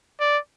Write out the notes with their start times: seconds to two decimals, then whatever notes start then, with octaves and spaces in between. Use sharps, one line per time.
0.20 D5